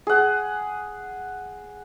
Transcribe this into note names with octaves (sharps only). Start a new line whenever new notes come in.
G#4 F#5